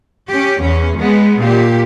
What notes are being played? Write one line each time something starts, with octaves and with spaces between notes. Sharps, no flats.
C#4 G4
E2 C#4
G#3 B3
A#2 G4